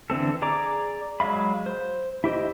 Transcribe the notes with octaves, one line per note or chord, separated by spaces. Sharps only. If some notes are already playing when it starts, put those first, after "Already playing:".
D3 E3 C4 A4
G#4 D5 A#5 D6
F#3 G#3 E5 F5 B5
C5
E4 G4 C5 D#5